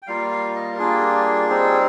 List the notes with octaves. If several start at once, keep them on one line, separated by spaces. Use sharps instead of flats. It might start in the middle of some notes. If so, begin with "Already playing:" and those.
G5
G3 A#3 F4 F5
F5
D#5
A#4
G3 A#3 D4 F4 G#4
G3 C4 D#4